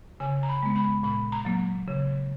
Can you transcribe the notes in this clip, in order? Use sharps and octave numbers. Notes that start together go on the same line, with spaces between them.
C#3 G#5
A#5
B5
G#3 B3
B5
A#2 B5
A#5
F#3 A#3
C#3